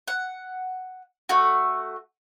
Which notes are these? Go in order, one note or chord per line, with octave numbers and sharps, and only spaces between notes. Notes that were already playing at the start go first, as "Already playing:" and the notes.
F#5
A3 F#4